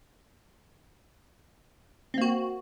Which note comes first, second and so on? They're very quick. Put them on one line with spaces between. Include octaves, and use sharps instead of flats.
C4 A#3 F#4